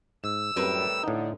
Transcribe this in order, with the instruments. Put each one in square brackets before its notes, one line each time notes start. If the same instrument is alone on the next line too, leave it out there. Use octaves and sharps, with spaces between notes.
[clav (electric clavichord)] G#2 [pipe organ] E6
[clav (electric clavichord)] F#2 [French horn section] A2 G3 [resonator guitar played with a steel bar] C4 A#4 B4
[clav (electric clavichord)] A2 D#4 [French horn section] D3